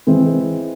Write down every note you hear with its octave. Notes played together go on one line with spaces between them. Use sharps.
E3 G#3 C4